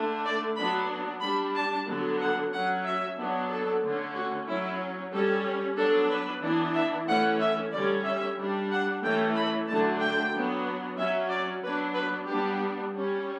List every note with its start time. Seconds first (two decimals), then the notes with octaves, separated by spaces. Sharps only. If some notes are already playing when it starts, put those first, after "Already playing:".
Already playing: D3 A3 D4
0.25 D5
0.57 F#3 B3 D4 B5
1.22 G3 D4 B5
1.55 A5
1.87 D3 F#3 B3 D4
2.20 F#5
2.52 F#3 C#4 F#5
2.85 E5
3.18 F#3 B3 D4
3.49 A4
3.82 D3 A3 C#4
4.15 F#4
4.48 F#3 C#4 E4
5.12 G3 C#4 A4
5.77 F#3 B3 D4 A4
6.10 B4
6.42 E3 B3 D4
6.75 E5
7.08 E3 A3 C#4 F#5
7.40 E5
7.72 D3 G3 C#4 D5
8.05 E5
8.37 G3 D4
8.70 F#5
9.02 E3 A3 C#4 G5
9.35 B5
9.68 D3 F#3 A3 D4 A5
10.00 G5
10.33 F#3 B3 D4
10.98 F#3 C#4 E5
11.31 D5
11.62 F#3 B3 D4 B4
11.95 B4
12.28 G3 B3 D4 G4
12.93 G3 C#4